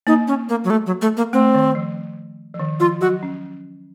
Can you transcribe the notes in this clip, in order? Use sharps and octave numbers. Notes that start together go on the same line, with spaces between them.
A#3 D#4
C#4
A#3
F#3
A3
F#3
A3
A#3
A3 C4
D#3
F3
F3
D#3
F3 F4
F#3 F#4
C#4